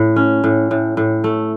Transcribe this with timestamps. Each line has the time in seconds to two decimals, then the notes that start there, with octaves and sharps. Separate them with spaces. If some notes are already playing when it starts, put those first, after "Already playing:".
Already playing: A2
0.16 C#4
0.44 A2
0.71 A2
0.97 A2
1.24 A3